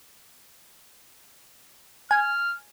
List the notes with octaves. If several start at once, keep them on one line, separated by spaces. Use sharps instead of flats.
G#5 F6